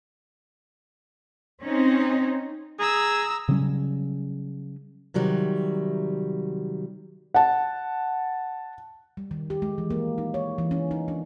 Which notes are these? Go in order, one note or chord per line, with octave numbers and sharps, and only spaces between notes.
C4 C#4 D#4
G#4 A#5 E6
C#3 F#3 G3 C#4
C3 D#3 F#3 G3
F#5 A5
G3
D#3
G4
G#3
E3
A#3
D#4
C#5
E3
C#4
D#4
D4